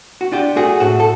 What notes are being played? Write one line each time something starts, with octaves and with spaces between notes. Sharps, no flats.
F#4
D4 F4 G4
A3 F#4 G#4
A2 F#4
A4